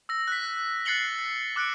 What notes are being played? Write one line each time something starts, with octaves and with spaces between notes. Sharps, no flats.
E6 A#6
F#6 B6
F#6 A6 C7 C#7 F#7 G7
B6
D6 F#6 C#7 D7